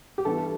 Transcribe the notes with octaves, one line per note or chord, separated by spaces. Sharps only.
G4
G2 E3 B3 E4 A4